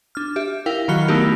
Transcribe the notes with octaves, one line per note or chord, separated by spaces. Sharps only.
D4 F6
G4 E5
E4 A#4 F5 G5
D#3 F#3 F#4 B5 F6 G7
A3 B3 D#4 E4 G4 A#4